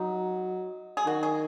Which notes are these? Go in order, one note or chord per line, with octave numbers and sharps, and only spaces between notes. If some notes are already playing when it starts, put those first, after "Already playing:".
Already playing: F#3 D#4
G#4
D#3 F#4
G#4